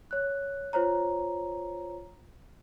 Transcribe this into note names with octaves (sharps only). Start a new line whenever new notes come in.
C#5 F#6
F4 C5 C#5 A#5